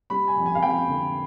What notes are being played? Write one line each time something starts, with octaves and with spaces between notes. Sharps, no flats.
G3 B5
G#5
F2
G#5
F5
F2 G5
D3